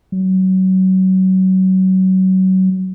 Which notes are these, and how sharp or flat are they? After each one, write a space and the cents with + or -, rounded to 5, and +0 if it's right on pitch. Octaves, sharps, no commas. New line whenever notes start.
F#3 +25